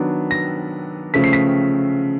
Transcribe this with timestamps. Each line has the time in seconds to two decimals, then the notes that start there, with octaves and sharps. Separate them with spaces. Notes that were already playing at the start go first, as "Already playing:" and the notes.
Already playing: D#3 F#3 B3 D4
0.31 A#6
1.14 C#3 F3 A3 B6
1.24 C7
1.33 B6